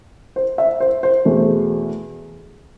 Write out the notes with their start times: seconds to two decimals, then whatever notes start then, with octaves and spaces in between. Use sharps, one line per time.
0.36 C5
0.58 E5
0.80 C5
1.03 C5
1.25 E2 B2 A3